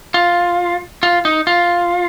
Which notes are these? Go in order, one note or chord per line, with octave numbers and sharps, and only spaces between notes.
F4
F4
D#4
F4